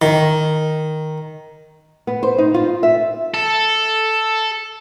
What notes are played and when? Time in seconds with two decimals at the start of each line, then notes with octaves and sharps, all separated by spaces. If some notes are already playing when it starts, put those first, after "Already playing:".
0.02 D#3
2.07 B3
2.23 C5
2.38 D#4
2.54 F4
2.83 E5
3.34 A4